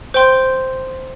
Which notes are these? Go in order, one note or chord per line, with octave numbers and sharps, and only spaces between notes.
C5 G5 C6 G6